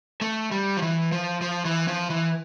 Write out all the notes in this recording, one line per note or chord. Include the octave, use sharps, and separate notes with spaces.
A3
G3
F3
E3
F3
F3
E3
F3
E3